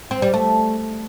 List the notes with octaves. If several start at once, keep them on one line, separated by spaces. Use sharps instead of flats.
C4
G3
A3